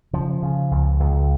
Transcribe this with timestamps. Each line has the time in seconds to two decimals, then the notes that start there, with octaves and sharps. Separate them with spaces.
0.13 C#3 F3
0.43 C#3
0.71 C#2
1.00 C#2